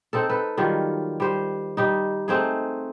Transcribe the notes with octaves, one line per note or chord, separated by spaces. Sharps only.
C4 D#4 A4
A4 B4
D#3 F#3 G3 F4
G3 C5
G3 D#4
A3 C4 D#4 G#4